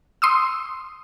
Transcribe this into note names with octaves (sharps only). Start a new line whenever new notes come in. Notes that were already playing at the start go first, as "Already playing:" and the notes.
C6 D#6 E6